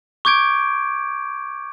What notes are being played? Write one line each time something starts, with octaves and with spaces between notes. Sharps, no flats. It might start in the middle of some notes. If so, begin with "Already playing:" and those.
C#6 D6 G6 G#6 D7